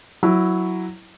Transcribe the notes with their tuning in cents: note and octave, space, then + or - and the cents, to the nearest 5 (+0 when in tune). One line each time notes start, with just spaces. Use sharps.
F#3 +0 E4 +0